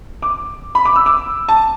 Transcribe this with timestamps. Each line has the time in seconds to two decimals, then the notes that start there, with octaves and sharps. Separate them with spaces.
0.22 D6
0.75 B5
0.85 D6
0.96 E6
1.06 D6
1.49 A5